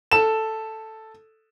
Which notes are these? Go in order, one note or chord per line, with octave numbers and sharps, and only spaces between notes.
A4 E7